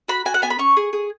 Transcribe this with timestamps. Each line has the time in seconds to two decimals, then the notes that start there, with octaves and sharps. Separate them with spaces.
0.08 F#4 B5
0.25 F#4 G#5
0.34 F#5
0.42 B3 G#5
0.50 B5
0.58 C#4 C#6
0.77 G#4
0.93 G#4